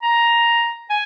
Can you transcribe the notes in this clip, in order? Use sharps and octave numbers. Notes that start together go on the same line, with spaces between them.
A#5
G#5